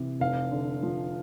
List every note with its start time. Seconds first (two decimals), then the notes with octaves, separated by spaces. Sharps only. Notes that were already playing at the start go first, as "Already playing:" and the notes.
Already playing: C3 E3
0.20 F1 F5
0.51 D3
0.83 F3